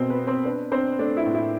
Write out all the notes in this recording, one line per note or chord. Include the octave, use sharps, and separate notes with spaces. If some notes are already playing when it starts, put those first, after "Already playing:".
Already playing: B2 B3 C4 C5
B4
B3
C4 C5
D4 B4
C4 D4 C5
A3 D4 D5
E4 E5
A2
E4 E5